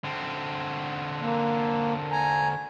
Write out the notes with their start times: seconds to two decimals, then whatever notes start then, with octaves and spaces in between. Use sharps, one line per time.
0.04 D3 C4
1.21 A#3
2.12 G#5 A#5